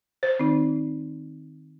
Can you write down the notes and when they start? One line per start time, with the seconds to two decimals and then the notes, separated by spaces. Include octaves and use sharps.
0.23 C5
0.39 D#3 C4 D#4